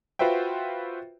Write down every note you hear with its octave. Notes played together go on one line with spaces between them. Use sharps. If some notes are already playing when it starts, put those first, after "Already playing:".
F4 F#4 B4 C5 E5 G5